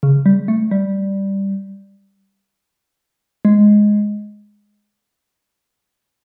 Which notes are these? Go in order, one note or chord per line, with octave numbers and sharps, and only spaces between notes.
C#3
G3
A3
G3
G#3